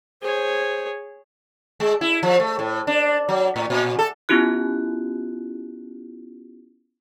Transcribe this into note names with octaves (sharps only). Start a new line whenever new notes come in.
G#4 C5 C#5
G#3
E4
F3
A3
A2
D4
F#3
A2
A#2
A4
B3 C#4 E4 F4 G4 F#6